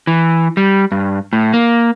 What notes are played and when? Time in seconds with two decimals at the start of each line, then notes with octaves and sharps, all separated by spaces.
0.07 E3
0.57 G3
0.92 G2
1.33 A2
1.54 A#3